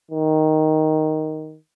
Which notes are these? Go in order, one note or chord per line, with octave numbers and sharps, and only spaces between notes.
D#3